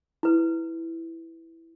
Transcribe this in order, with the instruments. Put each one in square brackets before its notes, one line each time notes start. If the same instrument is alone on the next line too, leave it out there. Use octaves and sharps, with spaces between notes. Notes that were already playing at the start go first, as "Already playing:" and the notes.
[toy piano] E4 B4